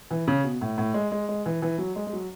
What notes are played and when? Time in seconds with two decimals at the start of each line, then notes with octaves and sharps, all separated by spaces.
0.11 E3
0.28 C#3
0.44 B2
0.61 A2
0.78 A2
0.94 G#3
1.12 G#3
1.28 G#3
1.46 E3
1.62 E3
1.78 F#3
1.96 G#3
2.07 G#3
2.13 F#3